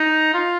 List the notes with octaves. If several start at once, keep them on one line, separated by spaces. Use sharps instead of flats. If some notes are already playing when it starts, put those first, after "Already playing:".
Already playing: D#4
F4